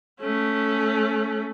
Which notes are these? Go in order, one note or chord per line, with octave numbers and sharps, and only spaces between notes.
A3 C#4